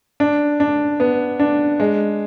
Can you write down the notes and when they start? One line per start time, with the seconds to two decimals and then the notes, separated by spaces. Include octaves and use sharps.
0.20 D4
0.60 D4
1.00 B3
1.40 D4
1.80 G#3